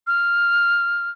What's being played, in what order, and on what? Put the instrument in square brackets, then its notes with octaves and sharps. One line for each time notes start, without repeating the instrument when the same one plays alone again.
[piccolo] F6